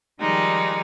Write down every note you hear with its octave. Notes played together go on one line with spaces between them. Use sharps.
D#3 F3 G3 G#3 D#4